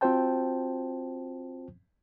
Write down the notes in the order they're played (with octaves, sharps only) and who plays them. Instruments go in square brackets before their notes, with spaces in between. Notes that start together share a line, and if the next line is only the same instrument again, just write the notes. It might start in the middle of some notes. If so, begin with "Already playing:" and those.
[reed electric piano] C4 F4 F#4 C5 G5 A5